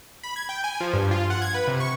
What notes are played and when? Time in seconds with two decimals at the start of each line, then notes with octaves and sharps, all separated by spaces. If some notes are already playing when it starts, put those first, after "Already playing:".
0.23 B5
0.36 G#6
0.49 G5
0.64 G#5
0.81 F3
0.93 G2
1.11 F4
1.30 F#5
1.42 G#6
1.54 B4
1.67 C3
1.80 C#6